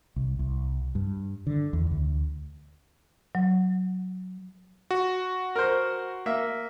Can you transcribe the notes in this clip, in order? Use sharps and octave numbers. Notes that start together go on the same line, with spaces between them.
C2
C2
G2
D3
E2
D2
F#3
F#4
A#4 C5
A#3 E5